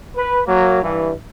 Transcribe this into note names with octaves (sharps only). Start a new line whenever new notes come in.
B4
F#3 A#3
G2 E3